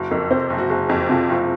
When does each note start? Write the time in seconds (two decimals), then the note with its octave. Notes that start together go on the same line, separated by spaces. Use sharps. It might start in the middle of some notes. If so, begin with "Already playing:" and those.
Already playing: F#1 F#4
0.11 F2 A#4
0.31 C3 C5
0.50 F#1
0.58 F#4
0.70 F#1 G#4
0.89 F2 F#4
1.09 C3 F4
1.29 F#1 F4